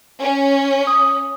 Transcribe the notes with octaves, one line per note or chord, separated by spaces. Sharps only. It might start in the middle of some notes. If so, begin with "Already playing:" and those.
C#4
D#6